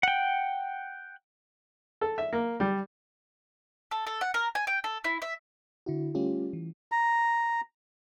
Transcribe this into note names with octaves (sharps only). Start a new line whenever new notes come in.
F#5 G5
A4
E5
A#3
G3
A4
A4
F#5
A#4
G#5
G5
A4
E4
E5
D3 E4 F#4
G3 A3 C#4 F4 G4
E3
A#5